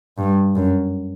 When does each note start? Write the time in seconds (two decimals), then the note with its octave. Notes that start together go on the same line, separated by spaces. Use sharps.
0.18 G2
0.55 F#2